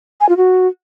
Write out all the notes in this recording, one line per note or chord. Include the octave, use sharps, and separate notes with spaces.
G#5
F4
F#4